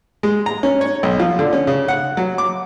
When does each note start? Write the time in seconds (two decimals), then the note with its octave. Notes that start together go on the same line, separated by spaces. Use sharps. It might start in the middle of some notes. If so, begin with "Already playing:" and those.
0.23 G#3
0.46 A#5
0.63 C#4
0.81 C#5
1.03 B1
1.20 F3
1.39 D3
1.53 C#4
1.67 C#3
1.88 F#5
2.17 F#3
2.38 D6